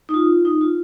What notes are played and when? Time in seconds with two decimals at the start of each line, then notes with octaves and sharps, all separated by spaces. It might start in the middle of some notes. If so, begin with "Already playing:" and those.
0.09 D#4
0.14 F4
0.45 D#4
0.61 F4